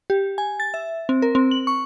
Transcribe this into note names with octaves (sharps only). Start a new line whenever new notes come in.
G4
G#5
A6
E5
C4
A#4
C4
F#7
C#6